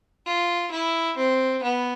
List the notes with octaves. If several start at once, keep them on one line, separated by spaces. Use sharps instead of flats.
F4
E4
C4
B3